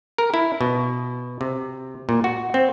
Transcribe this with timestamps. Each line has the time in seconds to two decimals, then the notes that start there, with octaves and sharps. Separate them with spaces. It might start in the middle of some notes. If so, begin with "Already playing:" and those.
0.18 A#4
0.34 E4
0.61 B2
1.41 C3
2.09 A#2
2.24 F#4
2.54 C4